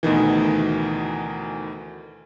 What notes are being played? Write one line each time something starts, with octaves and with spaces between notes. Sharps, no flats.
D2 B2 D#3 E3